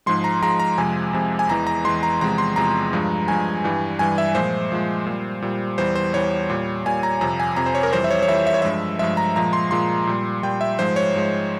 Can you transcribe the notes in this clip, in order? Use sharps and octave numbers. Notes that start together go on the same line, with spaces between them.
G#2 F3 G#3 C6
A#5
G#2 F3 G#3 A#5
A#5
F2 C3 F3 G#3 G#5
F2 C3 F3 G#3
G#5
E2 E3 G#3 A#5
A#5
E2 E3 G#3 C6
A#5
E2 C3 F3 G#3 A#5
C6
E2 C3 F3 G#3 A#5
G2 F3 G#3
G2 F3 G#3 G#5
G2 E3 G3
G2 E3 G3 G#5
E5
A#2 F3 G#3 C5
A#2 F3 G#3
A#2 G3
A#2 G3
E2 E3 G3 C5
C5
E2 E3 G3 C#5
A#2 G3
A#2 G3 G#5
A#5
F2 C3 F3 A#5
G#5
F2 C3 F3 A#5
C5
C#5
A#4
F2 E3 G3 C5
E5
C#5
C#5
F2 E3 G3 E5
E5
C#5
G2 F3 G#3 E5
G2 F3 G#3 E5
A#5
A#2 F3 G#3 A#5
C6
A#2 F3 G#3 C6
A#2 G3
A#2 G3 G5
E5
G#2 F3 G#3 C5
C#5
G#2 F3 G#3